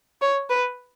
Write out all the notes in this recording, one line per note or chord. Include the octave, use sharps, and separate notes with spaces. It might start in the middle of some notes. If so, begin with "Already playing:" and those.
C#5
B4